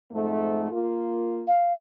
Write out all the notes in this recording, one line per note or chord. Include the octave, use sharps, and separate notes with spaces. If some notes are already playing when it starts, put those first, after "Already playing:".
F2 G#2 A3
A#3 F4
F5